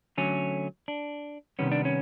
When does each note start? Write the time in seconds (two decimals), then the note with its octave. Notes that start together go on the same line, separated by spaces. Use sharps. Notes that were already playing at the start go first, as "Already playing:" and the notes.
0.18 D3 F#3 A3 C#4
0.88 D4
1.59 C3 D#3 G3 B3 C#4
1.72 D4
1.85 C#4